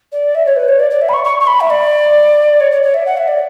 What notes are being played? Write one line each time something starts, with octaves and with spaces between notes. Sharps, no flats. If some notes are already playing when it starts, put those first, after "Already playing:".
D5
E5
C#5
B4
C#5
D5
D5
E5
B5
C#6
C#6
C#6
B5
E5
D5
C#5
C#5
C#5
E5
F#5
E5
D5